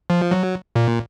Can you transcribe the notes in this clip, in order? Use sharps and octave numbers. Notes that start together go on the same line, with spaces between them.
F3
F#3
A#2